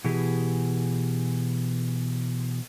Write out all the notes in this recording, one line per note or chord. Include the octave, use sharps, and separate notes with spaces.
B2 E3 E4 G4 G#4